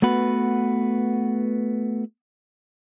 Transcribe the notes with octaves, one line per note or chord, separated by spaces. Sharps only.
A3 B3 F#4 B4